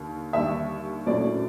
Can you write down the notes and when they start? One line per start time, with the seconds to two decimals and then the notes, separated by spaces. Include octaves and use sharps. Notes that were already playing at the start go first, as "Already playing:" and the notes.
Already playing: D#2 D3
0.33 D#2 D3 G3 E5
1.06 A#1 A2 F#3 A3 C#4 D5